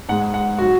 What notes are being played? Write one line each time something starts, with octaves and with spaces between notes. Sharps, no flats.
G#2 G#3 F#5
F#5
F#3 F#4